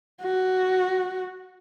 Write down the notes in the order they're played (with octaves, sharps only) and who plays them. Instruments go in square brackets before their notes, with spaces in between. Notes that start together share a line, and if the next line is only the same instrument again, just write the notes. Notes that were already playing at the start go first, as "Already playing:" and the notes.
[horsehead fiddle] F#4